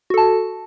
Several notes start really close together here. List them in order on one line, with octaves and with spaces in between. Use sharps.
F#4 A4 A5